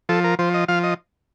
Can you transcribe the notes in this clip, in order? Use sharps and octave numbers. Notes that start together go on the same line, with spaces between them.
F3 A4
A#4
F3 C5
D#5
F3 F5
D#5